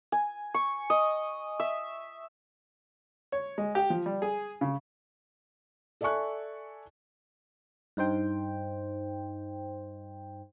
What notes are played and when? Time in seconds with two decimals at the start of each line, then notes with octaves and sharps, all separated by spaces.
0.12 G#5
0.54 C#6
0.90 D#5
1.60 E5
3.32 C#5
3.58 G#3
3.75 G4
3.90 F3
4.06 G3
4.22 G#4
4.61 C#3
6.01 A4 D5 E5 G#5 C#6 F#6
7.97 G2 D#4 C5 G5